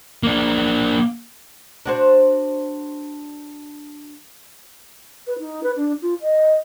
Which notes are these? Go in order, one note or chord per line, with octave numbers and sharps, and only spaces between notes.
A#3 D4
D4 F#4 C5
B4
D#4
B4
D4
F4
D#5